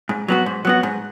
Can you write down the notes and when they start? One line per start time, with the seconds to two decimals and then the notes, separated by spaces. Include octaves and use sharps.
0.09 G#2
0.28 F#3 B3 F#4
0.46 G#2
0.65 F#3 B3 F#4
0.83 G#2